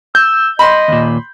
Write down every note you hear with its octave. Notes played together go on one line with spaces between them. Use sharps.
E6 G6
D#5 B5 C6
D#2 A#2